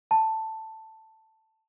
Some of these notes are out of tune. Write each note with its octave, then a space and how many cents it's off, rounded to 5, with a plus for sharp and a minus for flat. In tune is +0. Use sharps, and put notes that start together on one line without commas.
A5 +10